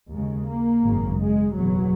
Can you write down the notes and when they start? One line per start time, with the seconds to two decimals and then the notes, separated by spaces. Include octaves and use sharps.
0.12 D#2 C#3 G#3
0.48 A#3
0.84 G#1 F#2 C#3
1.20 G#3
1.55 F#1 E2 B2 F#3